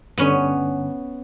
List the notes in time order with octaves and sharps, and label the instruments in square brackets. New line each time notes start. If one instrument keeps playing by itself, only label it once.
[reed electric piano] G2 D3 [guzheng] B3 C#4